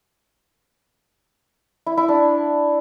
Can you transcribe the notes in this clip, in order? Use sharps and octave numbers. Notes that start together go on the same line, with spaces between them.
E4
E4
D4